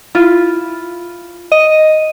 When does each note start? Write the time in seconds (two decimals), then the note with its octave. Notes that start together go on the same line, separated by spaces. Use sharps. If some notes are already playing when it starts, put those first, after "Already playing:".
0.15 E4 F4
1.52 D#5